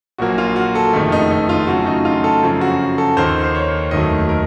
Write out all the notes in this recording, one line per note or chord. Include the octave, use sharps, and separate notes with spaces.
A#1 A#2 F#3 A#3 F#4
F4
F#4
A4
F#1 F2 D#3 A3
D#4
D#4
F4
F#2 C#3 A3 F#4
D#4
F4
A4
F#2 C#3 F3
F#4
A4
D#2 D#3 A#3 C5
C5
C#5
F1 D#2 D#3 F#3 A3 D#5
A#4